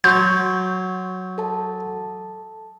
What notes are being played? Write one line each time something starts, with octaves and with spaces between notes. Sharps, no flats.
F#3 C6 C#6 G6
A4 A5